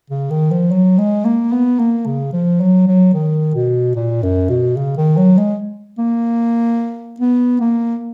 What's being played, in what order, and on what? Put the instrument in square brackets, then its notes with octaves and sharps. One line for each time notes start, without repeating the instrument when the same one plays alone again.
[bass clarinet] C#3
D#3
F3
F#3
G#3
A#3
B3
A#3
C#3
F3
F#3
F#3
D#3
B2
A#2
F#2
B2
C#3
D#3
F#3
G#3
A#3
B3
A#3